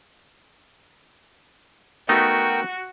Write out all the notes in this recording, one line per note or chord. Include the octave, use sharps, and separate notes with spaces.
A3 B3 D#4 F#4 A#4 G5